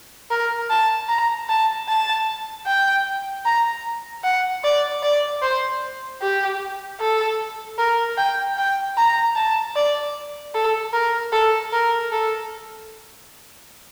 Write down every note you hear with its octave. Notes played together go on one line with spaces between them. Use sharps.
A#4
A5
A#5
A5
A5
G5
A#5
F#5
D5
D5
C5
G4
A4
A#4
G5
G5
A#5
A5
D5
A4
A#4
A4
A#4
A4